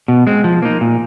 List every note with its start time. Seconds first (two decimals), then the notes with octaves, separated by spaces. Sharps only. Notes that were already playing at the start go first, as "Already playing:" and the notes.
0.08 B2
0.27 G#3 C4
0.44 F3
0.62 A#3 D#4
0.81 A#2